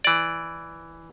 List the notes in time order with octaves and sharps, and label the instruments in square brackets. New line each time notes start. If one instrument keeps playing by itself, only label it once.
[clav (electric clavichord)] E3 D5